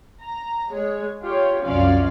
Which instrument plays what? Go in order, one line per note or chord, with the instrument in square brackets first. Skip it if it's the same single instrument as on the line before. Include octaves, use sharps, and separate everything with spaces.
[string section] A#5
G#3 C#5
F4 G4 C#5
C2 F#2 C#4 F4 D5 F5